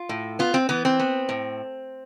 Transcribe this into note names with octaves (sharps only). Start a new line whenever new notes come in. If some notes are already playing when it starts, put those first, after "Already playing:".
Already playing: F4
A2
B3 F4
C4
E3 B3
C4
B3
A2